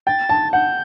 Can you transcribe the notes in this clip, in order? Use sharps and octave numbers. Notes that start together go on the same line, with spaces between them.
G5 A6
A5
F#5 G6